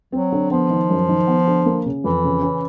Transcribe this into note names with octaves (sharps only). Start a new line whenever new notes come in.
F#3 C4
D3
F3 B3
D#3
F#2
D#3
B3
D3
A#3
C#3
F2 E3
C#3
C#4